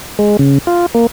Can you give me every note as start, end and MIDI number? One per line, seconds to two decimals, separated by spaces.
0.19 0.37 56
0.39 0.59 49
0.67 0.86 65
0.95 1.07 58